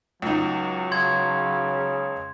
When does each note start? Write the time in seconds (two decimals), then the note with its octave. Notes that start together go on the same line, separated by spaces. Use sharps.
0.22 C#2 F#3 D#4
0.91 C#3 C6 G#6